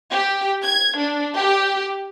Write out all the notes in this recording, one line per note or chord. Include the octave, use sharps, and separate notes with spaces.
G4
G#6
D4
G4